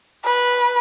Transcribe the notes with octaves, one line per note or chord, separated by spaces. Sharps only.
B4